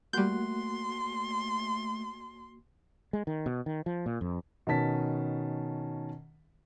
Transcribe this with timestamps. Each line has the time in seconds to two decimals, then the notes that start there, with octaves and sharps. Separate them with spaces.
0.13 G3 A3 A#3 F#4 C6 F#6 G6
3.13 G#3
3.27 D#3
3.46 B2
3.66 D#3
3.86 F3
4.06 A#2
4.21 F2
4.67 B2 D#3 C#4 A5 B6